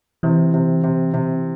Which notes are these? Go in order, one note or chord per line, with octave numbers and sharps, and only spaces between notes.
C3 E3
C3
C3
C3